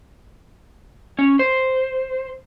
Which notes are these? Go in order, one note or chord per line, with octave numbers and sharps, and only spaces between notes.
C#4
C5